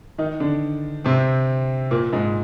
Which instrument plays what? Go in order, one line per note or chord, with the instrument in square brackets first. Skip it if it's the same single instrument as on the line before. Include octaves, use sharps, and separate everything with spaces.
[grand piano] D#3 D#4
D3 D4
C3 C4
A#2 A#3
G#2 G#3